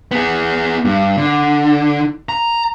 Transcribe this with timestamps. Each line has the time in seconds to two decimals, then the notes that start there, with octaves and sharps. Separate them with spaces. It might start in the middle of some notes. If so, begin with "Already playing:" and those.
0.11 B3 G#4
0.85 G2
1.17 D3
2.29 A#5